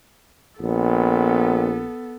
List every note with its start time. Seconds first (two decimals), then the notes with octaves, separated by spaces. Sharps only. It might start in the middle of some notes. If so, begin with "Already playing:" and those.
0.61 A#1 B3 A4